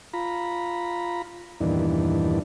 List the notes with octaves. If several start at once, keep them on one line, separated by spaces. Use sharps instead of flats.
F4 A#5 B5
E2 G2 A#2 D#3 E3 D4